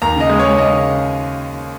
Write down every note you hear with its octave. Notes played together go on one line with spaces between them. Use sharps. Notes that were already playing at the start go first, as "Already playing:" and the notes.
D#2 A#5
C#3 D#5
G#3
C#5
G#3
C#3 D#5
C#3